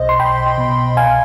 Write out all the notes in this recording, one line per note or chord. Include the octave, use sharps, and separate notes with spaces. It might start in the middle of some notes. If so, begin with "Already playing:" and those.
Already playing: B1 B2 C5 D#5
C6
B1 G5 B5
B2
C2 F5 G#5